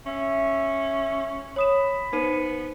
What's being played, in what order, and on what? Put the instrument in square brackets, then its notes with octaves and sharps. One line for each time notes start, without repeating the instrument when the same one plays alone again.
[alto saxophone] C#4 [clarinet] E5
[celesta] C#5 D#6 E7 [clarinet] B5
[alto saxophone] B3 [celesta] D#4 C5 D#7